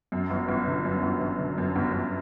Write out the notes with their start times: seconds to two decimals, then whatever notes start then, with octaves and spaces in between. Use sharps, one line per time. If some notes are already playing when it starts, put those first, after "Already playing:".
0.12 F#2
0.30 G1
0.48 G1
0.67 D3
0.85 F#2
1.03 G1
1.21 G1
1.39 D3
1.58 F#2
1.76 G1
1.93 G1